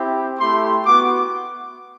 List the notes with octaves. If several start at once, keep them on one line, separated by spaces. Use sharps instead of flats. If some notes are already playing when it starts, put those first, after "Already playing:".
Already playing: C4 E4 G4
A3 E4 G4 C6
B3 F#4 D6